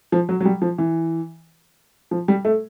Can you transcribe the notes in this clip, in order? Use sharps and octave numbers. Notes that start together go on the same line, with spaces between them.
F3
F#3
F#3
G3
F3
E3
F3
G3
A3